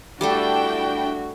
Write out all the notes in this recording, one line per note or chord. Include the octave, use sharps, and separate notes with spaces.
G3 A3 D4 E4 F#4 A4 G5